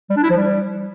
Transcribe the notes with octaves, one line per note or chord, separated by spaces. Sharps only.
G3
D4
E4
F3
G3